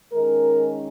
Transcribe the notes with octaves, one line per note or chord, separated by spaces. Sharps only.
D#3 G#3 C#4 A#4